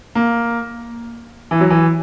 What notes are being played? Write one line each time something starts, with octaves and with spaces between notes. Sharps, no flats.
A#3
E3
F#3
E3